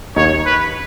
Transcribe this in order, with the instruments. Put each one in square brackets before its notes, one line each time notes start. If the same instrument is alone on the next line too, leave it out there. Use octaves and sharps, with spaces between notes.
[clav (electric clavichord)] D#2 D#3 [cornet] C#5
[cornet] B4